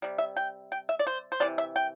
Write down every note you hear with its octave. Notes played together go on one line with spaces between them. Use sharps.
C3 G3
E5
G5
G5
E5
D5
C5
C5
C3 E3 D5
E5
G5